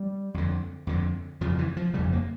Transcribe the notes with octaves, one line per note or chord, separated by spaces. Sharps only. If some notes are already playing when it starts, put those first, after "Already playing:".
Already playing: G3
F2 D3
F2 D3
F2 C#3 F3
E3
F3
F2 C#3 G3
A#3